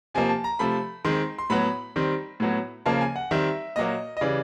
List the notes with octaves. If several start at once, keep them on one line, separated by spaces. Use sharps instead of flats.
C3 F3 A#3 G#5
A5
A#5
C3 F3 A3 B5
D#3 G#3 C4 C6
C6
A2 F#3 B3 B5
D#3 G3 C4
A2 F#3 B3
C#3 F3 A#3 A5
G#5
F#5
D#3 G3 C4 E5
A#2 F#3 A#3 D#5
D#5
C#3 E3 G3 D5